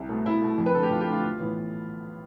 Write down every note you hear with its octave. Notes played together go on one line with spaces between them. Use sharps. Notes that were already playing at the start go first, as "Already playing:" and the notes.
Already playing: C2
B2 A3
C2 E4
B2 A3
F2
B4
D3 A3 A4
G4
F2 F4
G4
D3 A3 F4
B1
A2 E3 B3